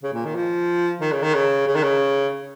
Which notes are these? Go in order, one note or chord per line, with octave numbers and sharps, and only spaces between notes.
C#3
A#2
D#3
F3
D#3
C#3
D#3
C#3
C#3
D#3
C#3